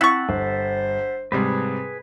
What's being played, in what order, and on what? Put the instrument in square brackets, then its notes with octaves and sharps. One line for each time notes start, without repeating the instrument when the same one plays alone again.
[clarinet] C4 [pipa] E4 C#6 [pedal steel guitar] E5 F#5 A5
[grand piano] G1 [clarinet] C5
[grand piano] G#2 C3 G3 [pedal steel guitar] G#4 B4